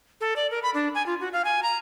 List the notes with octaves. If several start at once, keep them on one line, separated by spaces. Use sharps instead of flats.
A4
D5
A#4
B5
D4
G#5
F4
F#4
F5
G#5
A#5